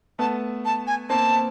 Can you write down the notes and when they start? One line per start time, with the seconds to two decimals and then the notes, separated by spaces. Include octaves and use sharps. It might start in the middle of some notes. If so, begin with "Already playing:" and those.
0.19 A3 B3 A5
0.65 A5
0.87 G#5
1.10 A#3 C4 A5